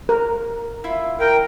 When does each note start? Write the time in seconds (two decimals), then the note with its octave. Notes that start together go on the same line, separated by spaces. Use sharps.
0.09 A#4
0.84 E4 F4 E5
1.20 A#3 A#4 G5